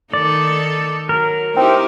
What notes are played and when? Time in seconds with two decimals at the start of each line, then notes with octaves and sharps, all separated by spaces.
0.14 D#3 D#4 A4 D5
1.09 F#3 A#4
1.57 C4 D#4 E4 G4